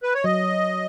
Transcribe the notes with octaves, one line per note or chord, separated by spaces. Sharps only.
B4
C#5
F#3 D#5